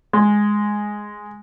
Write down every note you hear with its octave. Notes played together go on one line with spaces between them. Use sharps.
G#3